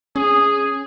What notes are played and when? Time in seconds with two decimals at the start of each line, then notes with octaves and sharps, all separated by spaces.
0.16 C#4 G#4